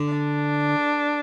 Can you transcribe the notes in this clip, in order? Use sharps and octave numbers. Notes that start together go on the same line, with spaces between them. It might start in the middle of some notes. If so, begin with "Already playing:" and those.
Already playing: D3
D4